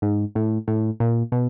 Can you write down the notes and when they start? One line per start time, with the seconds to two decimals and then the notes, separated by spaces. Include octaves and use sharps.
0.02 G#2
0.35 A2
0.68 A2
1.00 A#2
1.32 B2